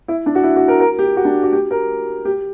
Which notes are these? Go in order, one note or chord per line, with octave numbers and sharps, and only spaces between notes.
E4
D4
F#4
E4
F#4
A#4
A#4
G4
F#4
D4
F#4
G4
A#4
G4